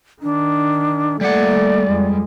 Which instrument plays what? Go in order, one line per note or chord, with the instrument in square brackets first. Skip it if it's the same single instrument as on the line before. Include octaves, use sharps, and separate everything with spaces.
[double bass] D#3 [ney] D4
[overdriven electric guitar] G3 F#5 [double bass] A3 A#3 [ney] D5
[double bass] F2 G#3